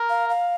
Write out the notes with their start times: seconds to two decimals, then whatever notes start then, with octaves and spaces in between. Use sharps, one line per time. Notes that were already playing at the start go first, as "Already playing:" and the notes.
Already playing: A#4
0.10 F5
0.29 F5